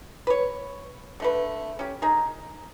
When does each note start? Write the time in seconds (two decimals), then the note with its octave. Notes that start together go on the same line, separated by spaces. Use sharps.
0.27 B4 C#5
1.20 D3 A3 B4
1.79 C#4 G4
2.02 D#4 G#4 A#4